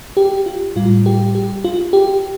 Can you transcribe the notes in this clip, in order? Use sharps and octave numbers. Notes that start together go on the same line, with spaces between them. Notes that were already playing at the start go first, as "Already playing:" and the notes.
G4
F4
A2 G3 F4
G4
G4
F4
G4